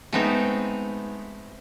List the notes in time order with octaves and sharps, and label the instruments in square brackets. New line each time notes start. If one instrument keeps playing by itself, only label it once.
[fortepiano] G#2 B3 [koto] A3 C4 D#4